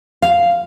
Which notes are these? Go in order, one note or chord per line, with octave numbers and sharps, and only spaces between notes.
F5